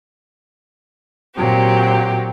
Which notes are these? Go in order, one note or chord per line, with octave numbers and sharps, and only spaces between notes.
A#2 F#3 C4 G4